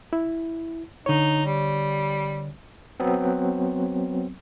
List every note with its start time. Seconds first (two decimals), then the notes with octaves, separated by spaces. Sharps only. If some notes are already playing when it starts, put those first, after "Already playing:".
0.13 E4
1.06 D3 D#4 C#5
1.45 G3
3.00 F#3 B3 C4